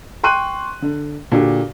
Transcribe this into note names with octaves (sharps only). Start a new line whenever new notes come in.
G5 C6 C#6 F#6 D#7
D3
A#2 D3 F#4 G4